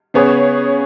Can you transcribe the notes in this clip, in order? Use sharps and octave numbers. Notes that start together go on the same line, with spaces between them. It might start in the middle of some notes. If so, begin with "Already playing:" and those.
C#3 B3 G#4 C#5